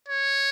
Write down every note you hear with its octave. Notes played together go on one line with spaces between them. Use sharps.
C#5